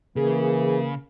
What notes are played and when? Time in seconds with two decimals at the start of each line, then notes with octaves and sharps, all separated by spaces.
0.16 C#3 E3 A#3 G#4